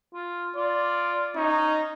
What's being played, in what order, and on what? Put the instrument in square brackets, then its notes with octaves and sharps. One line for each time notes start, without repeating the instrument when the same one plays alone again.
[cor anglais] F4
[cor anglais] F4 [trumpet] D5
[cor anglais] C#4 [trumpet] D#4